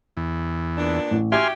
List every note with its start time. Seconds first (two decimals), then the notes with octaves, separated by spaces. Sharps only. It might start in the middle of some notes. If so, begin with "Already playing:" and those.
0.17 E2
0.77 A#2 B3 D4
1.11 A1
1.32 F#4 G4 E5 G#5 C6 F6 G#6